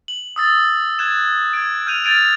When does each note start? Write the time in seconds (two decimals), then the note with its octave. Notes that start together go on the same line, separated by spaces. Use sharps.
0.08 F#7
0.36 D#6 E6 A6
0.99 F#6 G#6 E7
1.53 G#6 D7
1.86 F6 G6 D#7 F7
2.04 F6 G#6 A6 D7 D#7 F7